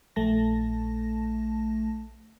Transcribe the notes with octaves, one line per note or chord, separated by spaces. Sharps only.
A#1 A3 A5 A#6